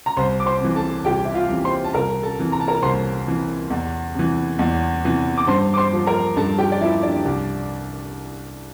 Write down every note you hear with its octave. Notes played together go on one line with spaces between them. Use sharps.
A#5
C2 C5 C6
D6
C5 C6
C3 E3
A4 A5
C2 G4 G5
E5
F4 F5
C3 E3
C5 C6
A5
C2 A#4 A#5
A4 A5
C3 E3
A#5
A5
A#4 A#5
C2 C5 C6
C3 E3
E2
C3 E3
E2
C3 E3
D6
G2 C5 C6
D6
C5 C6
F3
A#4 A#5
G2 A4 A5
G4 G5
D5
F3 E4 E5
D4 D5
C2